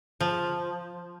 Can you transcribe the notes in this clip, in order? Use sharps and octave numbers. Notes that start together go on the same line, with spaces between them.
F3